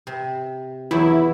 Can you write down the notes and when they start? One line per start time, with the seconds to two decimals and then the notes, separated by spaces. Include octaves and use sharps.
0.07 C3
0.91 E2 F#3 E4